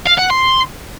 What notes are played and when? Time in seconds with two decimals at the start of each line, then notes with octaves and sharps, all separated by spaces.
0.07 F5
0.19 F#5
0.31 C6